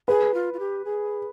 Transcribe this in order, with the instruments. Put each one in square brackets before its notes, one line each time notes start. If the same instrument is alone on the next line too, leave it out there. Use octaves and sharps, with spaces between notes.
[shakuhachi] G#4 [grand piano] B4
[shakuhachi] F4
F4
G4
G#4